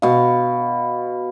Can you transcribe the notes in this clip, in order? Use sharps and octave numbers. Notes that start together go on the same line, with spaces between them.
B2 F5